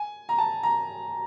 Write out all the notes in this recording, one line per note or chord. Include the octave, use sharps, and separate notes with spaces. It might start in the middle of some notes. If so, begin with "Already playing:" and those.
Already playing: G#5
A#5
A5
A#5